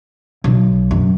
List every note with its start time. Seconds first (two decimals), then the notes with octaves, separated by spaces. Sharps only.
0.44 B1
0.91 F#2